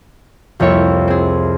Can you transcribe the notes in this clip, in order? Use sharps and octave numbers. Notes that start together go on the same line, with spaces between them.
C2 F2 A#3 C#5 E5 C#7
C4 G#4